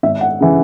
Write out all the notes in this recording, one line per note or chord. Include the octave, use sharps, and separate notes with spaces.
G#1 E5
F#5
C#3 E3